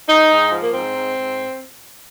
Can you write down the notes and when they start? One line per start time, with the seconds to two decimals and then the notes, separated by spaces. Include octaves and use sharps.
0.09 G#2 D#4
0.31 G#2
0.52 F3
0.63 A#3
0.73 G#2 C4
0.95 G#2
1.16 G#2